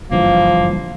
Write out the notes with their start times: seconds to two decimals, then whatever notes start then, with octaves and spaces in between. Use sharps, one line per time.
0.11 F#1 G2 E3 F3 A#3